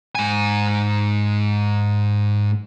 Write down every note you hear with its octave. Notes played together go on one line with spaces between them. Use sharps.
G#2 G#5